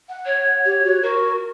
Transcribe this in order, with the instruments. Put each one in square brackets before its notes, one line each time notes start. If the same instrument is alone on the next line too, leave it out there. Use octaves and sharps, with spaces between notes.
[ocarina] F#5
[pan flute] C#5
[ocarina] G4
F#4
[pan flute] F#4 [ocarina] A#4